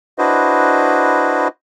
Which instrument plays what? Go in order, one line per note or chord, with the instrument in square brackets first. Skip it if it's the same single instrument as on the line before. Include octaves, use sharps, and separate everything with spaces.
[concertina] D4 E4 F#4 B4 C5 D#5